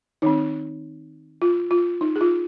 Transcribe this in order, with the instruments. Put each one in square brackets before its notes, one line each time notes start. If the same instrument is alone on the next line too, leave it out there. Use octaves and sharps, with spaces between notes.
[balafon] D#3 C4 D#4
F4
F4
D#4
G#4
F4